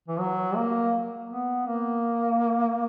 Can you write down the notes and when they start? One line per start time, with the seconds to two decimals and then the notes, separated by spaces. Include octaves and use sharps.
0.08 E3
0.20 F#3
0.56 A#3
1.30 B3
1.67 A#3